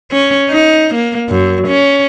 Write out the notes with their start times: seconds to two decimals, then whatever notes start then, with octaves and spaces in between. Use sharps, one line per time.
0.12 C#4
0.50 D#4
0.95 A#3
1.29 F#2
1.68 C#4